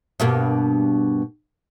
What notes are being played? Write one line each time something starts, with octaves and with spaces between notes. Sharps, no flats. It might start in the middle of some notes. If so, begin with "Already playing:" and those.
G2 B2 A#3